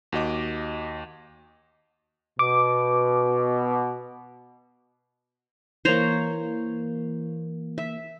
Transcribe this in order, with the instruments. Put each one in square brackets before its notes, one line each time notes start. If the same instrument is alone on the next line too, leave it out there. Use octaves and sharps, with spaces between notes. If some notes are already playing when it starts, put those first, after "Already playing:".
[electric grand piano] D#2 F#4 D#5 D6
[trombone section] B2 [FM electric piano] D6
[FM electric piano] E3 A#3 [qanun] C5 C#5 A#5
[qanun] E5